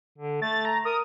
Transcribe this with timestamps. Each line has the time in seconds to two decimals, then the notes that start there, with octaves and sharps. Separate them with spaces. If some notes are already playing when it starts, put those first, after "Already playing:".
0.18 D3
0.42 A3 A6
0.65 A#5
0.85 A#4 D#6